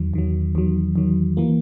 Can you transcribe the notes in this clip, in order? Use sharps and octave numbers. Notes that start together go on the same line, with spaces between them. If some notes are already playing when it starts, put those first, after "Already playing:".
Already playing: E2 D#3 F#3
E2 D#3 F#3
E2 D#3 F#3
E2 D#3 F#3
E3 A#3